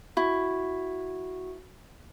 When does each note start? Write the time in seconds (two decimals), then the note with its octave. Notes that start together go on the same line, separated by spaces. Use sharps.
0.17 E4 F#4